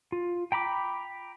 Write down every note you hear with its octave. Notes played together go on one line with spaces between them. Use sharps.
F4
G5 A#5 B5 D6